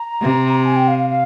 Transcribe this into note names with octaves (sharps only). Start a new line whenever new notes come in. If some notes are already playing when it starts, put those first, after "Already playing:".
Already playing: A#5
C3
G#5
G5
F5
F5
F5